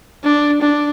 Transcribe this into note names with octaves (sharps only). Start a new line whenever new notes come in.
D4
D4